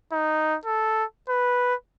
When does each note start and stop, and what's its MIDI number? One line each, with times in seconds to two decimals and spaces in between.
0.12 0.57 63
0.65 1.04 69
1.29 1.75 71